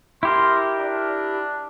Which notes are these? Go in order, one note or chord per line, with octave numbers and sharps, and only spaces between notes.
E4 G4 A#4 C6
D4